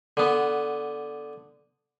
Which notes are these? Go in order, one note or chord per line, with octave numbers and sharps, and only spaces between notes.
D3 B3